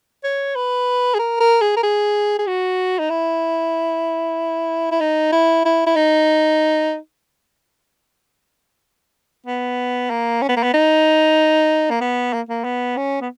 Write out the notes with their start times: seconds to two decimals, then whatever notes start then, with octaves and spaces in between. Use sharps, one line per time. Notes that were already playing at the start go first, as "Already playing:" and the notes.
0.24 C#5
0.55 B4
1.14 G#4
1.19 A#4
1.40 A#4
1.61 G#4
1.76 A#4
1.83 G#4
2.39 G#4
2.47 F#4
2.99 D#4
3.10 E4
4.91 E4
5.00 D#4
5.32 E4
5.65 E4
5.86 E4
5.96 D#4
9.46 B3
10.10 A#3
10.42 C#4
10.49 B3
10.56 A#3
10.63 B3
10.73 D#4
11.90 A#3
12.01 B3
12.33 A#3
12.49 A#3
12.64 B3
12.97 C#4
13.21 B3